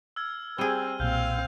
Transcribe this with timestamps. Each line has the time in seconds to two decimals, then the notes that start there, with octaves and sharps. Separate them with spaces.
0.16 E6 F6 G#6
0.58 G3 C4 G#4 D#7 G7
1.00 B1 A#2 C4 F5 F6 G6